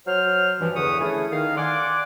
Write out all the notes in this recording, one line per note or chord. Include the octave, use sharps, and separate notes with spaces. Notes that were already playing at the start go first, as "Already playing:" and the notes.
F#3 C5 F6
G2 E3 F3
E2 G2 D3 B4 C#6 D#6
A3 C#4 E4 G#4
D#3 F5
D5 F#5 G#5 C6 D6